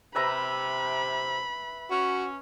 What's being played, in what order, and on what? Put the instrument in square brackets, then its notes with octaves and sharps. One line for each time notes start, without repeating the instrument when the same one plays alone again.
[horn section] C3 [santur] B4 E5 A#5 [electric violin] B5
[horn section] C#4 [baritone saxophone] F#4